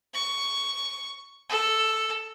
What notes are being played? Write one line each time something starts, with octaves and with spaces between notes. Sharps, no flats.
C#6
A4